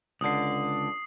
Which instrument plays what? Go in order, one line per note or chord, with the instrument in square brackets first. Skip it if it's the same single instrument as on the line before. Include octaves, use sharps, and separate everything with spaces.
[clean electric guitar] C#2 D3 [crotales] D#6 C7